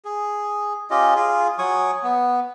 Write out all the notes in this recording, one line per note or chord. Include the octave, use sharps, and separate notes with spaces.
G#4
C#4 F4 G4 D#5
F4 G#4
F#3 G#5 C#6 D#6
B3